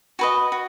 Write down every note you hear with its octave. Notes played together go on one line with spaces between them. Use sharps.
F#4 B4 D#5 G#5
F#4